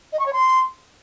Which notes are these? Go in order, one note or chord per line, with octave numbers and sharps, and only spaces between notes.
D#5
C#6
C#5
C6